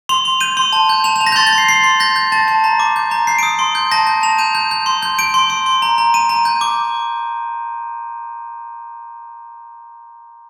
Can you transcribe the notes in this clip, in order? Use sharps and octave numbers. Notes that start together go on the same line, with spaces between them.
C6 F7
C6
G6 D#7
C6
A5
G6
A5 F7
F7
A5
A#6
G6
C6 A6
A6
C6
C7
C6 C7
C6
G6 A#6
G6
A5 A6
A5
A#5
D6
G6
A#5
G6 C7
D#6 D7
C6
G6
A5 A#6
G6
A5 F7
G6 D#7
G6
G6
C6
G6
G6 D7
C6
C6
C6
A#5
A#5
A#5 D#7
A#5
G6
D6